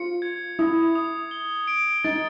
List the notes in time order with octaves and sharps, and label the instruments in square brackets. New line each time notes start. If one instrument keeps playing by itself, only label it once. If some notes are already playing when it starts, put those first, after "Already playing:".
Already playing: [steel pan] F4 [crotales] C#7
[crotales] G#6
[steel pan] E4 [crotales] D#6
[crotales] D#6
G7
D7
[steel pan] D#4 [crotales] A6